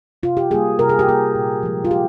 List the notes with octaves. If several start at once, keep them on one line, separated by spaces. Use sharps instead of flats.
C3 F4
G4
G3 A#3 G#4
C3 A#4
G#4
G4
G3 A#3 G#4
A#2
F3 G#3
F4
A#2 G4